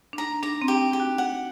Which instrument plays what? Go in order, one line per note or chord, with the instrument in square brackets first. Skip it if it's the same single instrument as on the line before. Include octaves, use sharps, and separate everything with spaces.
[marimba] D4
[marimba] D#4 [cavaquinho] A#5
[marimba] D4 [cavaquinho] A#5
[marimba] C4
[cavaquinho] G4
[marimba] D#4
[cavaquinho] G4
[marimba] F#4
[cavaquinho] F#5